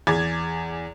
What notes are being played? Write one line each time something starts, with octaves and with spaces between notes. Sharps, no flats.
E2 G#4 D6 G#6 A6